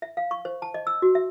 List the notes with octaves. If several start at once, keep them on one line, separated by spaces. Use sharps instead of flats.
E5
F5
C#6
C5
A5
D#5
E6
F#4
E5